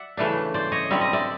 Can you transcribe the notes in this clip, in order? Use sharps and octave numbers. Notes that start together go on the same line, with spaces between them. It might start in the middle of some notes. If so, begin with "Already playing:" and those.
Already playing: D5 E5 F#5
C#3 E3 A3 D4
C5 D5
C#5 D#5
D3 G3 C4 E5
D#5
D5 E5